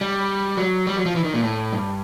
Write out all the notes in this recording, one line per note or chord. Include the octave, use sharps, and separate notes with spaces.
G3
F#3
G3
F#3
F3
E3
D#3
A#2
A2
G2